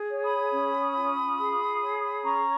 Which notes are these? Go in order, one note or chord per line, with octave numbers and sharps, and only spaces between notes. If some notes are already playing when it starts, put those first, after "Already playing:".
Already playing: G#4
C#5
B5 D#6
C#4
F4
G#4
C#5
C#4 A#5 C#6